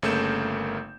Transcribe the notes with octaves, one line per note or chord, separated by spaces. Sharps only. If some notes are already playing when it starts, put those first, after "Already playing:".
G1 C#3 A3 A#3 G6 E7